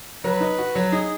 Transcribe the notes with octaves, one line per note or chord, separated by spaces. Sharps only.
F#3 B4
D#4
F#4
F#3
D#4 G#4